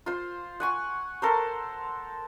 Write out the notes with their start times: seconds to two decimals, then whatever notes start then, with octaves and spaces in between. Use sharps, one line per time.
0.06 F4 C5
0.60 F#5 G#5 C#6
1.22 A4 A#4 C5